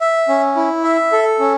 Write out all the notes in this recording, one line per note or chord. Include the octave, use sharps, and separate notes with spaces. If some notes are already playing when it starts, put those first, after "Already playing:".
E5
C#4
E4
E5
A4
C#4